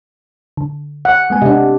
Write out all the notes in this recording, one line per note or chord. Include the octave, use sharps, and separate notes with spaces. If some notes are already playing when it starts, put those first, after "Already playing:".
D3
F#5
G#3 B3 G#5
C3 D4 D#5 F#5